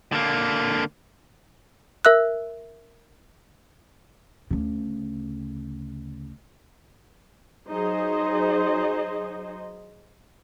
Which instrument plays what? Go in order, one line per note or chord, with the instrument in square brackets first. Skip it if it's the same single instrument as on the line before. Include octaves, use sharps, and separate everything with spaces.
[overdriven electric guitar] D3 A#3
[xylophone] A#4 E5 E6 F#6
[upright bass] D2 C#3
[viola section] F#3 D#4 G#4 C5 D#5